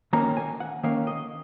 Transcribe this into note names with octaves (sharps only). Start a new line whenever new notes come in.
D#3 A#3 C#4 A#5
G#5
F#5
D#3 A#3 C#4 F5
D#5